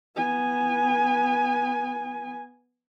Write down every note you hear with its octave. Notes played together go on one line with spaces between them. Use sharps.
B3 G#5